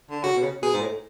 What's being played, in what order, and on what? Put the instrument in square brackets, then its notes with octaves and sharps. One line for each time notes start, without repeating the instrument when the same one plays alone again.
[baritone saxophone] D3
[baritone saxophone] C#3 [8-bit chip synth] F#4
[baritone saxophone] B2
C#3
[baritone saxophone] B2 [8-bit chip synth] G#4
[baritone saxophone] G#2
A2